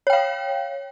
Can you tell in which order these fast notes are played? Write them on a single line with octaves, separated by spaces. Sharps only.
C#5 G5 F5